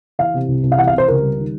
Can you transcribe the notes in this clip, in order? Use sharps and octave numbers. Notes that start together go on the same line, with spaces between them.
E3 F5
C3
C2
C2
F5
E3 F#5
F5
C3
C5
C#2 A#4
G3
D#3